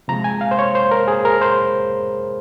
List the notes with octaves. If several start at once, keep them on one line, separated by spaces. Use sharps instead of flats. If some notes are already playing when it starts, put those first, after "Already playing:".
C3 F3 G#3 A#5
G#5
F5
C5
C#5
C5
A#4
G#4
A#4
C5